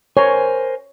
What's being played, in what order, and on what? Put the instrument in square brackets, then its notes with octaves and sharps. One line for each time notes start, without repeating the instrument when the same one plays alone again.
[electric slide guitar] A#4 C5 G#5 [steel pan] C#5